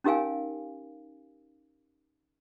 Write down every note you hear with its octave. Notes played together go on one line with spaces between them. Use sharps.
C#4 D#4 G4 A#4 F5 G#5